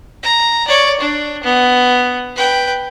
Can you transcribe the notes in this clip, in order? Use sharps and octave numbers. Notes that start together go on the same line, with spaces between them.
A#5
C#5 D5
D4
B3
B4 G5